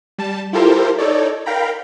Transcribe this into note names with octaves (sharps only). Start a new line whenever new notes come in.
G3 A5
E4 F4 G4 A4 A#4 C5
D#4 A4 C#5 D5
A#4 F5 G5 A#5 B5